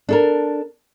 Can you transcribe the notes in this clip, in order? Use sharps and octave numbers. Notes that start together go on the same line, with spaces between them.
D4 A4 A#4